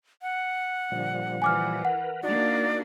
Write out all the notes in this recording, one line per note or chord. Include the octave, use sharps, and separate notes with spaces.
F#5
A#2 D3 F3 G3
E3 G#5 D6 F6
A#4 B4 F#5
A#3 D4 D#4 F#4 D5